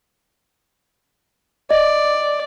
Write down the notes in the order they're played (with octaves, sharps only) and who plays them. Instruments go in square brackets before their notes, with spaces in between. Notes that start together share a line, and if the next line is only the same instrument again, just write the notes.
[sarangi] D5 [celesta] D#5